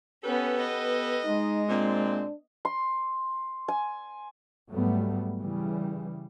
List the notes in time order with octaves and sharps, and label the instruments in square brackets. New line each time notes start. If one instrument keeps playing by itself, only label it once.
[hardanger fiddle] B3 C#4 [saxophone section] G4 A4 B4
[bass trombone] B3 [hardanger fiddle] D#5
[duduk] G#3 [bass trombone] D#4
[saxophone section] A#2 C4 [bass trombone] D4
[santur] C6
G#5
[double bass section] G#2 F#3 G3 A3 B3
C#3 E3 G3